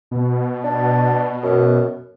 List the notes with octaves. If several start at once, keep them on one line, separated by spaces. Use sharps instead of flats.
B2
D4
F#2